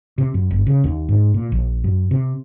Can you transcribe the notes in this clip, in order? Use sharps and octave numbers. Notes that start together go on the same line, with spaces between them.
C3
F#2
G1
C#3
D#2
G#2
A#2
A#1
F#2
C3